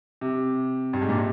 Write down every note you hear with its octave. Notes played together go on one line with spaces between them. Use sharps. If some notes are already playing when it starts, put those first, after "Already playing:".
C3
G2
G#2
A#2
C3